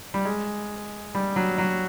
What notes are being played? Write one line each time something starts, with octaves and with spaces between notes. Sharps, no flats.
G3
G#3
G3
F#3
F#3